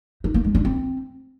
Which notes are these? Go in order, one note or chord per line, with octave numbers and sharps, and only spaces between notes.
D#4
A#3
G#3
D4
C4